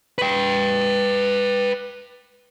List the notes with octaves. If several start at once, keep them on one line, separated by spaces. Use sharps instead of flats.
B4 G5